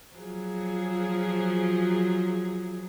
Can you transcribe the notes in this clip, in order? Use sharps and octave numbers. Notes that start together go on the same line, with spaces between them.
F3 F#3 G#4